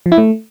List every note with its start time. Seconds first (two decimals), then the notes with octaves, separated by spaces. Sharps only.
0.06 F3
0.12 E4
0.18 A3